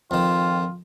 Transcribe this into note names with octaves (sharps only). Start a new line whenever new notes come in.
F2 D#3 F4